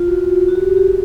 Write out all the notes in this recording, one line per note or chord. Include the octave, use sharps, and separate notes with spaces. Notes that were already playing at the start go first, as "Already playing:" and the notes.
Already playing: F4
F#4
F#4
G4
G4
G#4